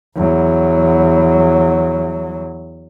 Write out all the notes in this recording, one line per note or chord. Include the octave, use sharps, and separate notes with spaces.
E2 F#3